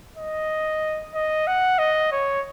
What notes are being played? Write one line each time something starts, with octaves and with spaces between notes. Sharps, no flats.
D#5
D#5
F#5
D#5
C#5